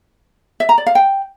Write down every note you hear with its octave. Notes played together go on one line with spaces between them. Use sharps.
E5
A#5
D5
F5
G5